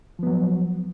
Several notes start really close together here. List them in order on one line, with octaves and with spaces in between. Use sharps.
F3 B3 F#3